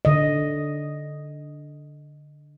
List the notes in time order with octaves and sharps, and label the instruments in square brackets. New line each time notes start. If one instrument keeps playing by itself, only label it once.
[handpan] D3 D#5